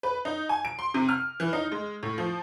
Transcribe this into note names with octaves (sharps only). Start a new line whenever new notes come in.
B4
D#4
G#5
D7
C6
C3
F6
E3
D#4
G#3
A2
F3